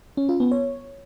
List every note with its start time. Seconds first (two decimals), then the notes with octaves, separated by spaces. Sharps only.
0.17 C#4
0.29 F4
0.40 B3
0.51 C#5